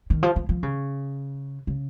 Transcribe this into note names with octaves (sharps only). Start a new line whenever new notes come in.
D#3
F3
F3
F3
C#3
C#3